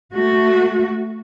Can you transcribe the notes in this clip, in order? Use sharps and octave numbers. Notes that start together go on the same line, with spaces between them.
A3 F#4